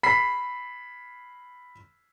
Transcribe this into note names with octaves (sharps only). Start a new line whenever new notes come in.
B5 B6 C7